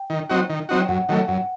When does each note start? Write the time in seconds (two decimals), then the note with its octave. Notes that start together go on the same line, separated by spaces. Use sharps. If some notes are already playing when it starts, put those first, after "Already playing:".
Already playing: G5
0.10 D#3
0.29 F#3 C4 D#4 F#4
0.50 D#3
0.69 F#3 C4 D#4 F#4
0.81 G5
0.88 F#2 F#5
1.08 D#3 F#3 A3 G5
1.28 F#2 F#5